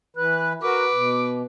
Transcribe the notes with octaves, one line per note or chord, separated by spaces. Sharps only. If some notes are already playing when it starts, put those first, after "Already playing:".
E3 B4 F#6
F#4 A#4 B4 D6
B2